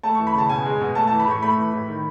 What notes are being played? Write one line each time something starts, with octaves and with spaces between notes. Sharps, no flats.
A3 A5
E3 C#6
B5
C#3 A5
B2 G#5
G#3
B2
A3 A5
E3 A5
B5
A2 C#6
A3 B5
E3
A2
D#3